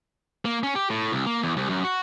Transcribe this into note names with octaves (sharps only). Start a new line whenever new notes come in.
A#3
C#4
G4
A2
C2
A#3
E2
C2
F#2
F#4